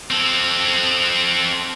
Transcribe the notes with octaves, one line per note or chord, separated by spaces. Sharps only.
C4 A4